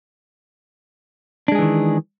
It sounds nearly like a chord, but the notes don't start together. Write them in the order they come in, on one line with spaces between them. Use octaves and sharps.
D4 G#3 G#4 E3 D#3